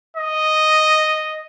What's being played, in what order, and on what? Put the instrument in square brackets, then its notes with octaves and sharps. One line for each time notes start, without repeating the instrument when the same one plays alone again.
[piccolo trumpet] D#5